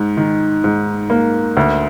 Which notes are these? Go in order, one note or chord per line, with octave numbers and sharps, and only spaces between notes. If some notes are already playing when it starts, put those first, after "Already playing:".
Already playing: G#2
D#3
G#2
A#3
D2